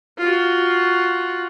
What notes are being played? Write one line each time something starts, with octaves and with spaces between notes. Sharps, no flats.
F4 F#4